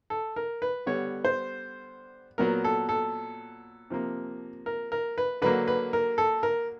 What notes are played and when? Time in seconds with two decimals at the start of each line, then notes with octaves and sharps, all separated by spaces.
0.10 A4
0.36 A#4
0.62 B4
0.86 D3 G3 B3 C#5
1.25 C5
2.38 A#2 F#3 B3 A#4
2.64 A4
2.89 A4
3.90 C3 F3 A#3
4.66 A#4
4.92 A#4
5.18 B4
5.42 D3 F#3 A#3 B4
5.68 B4
5.93 A#4
6.18 A4
6.43 A#4